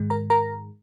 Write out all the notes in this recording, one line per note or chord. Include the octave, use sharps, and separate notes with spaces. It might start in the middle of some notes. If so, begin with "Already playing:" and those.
Already playing: G#2 D#3 G#3
A#4 A#5
A#4 A#5